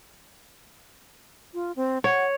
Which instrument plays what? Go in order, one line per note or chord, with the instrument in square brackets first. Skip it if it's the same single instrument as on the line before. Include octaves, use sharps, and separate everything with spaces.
[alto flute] F4
C4
[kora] C#5 [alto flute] F#5